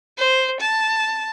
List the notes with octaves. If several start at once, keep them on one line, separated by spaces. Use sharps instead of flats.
C5
A5